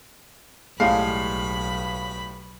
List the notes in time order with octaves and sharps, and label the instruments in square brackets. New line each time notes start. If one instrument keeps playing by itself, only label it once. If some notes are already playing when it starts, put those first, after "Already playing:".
[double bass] B1 [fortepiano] A2 G3 G#3 [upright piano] F5 [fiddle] B5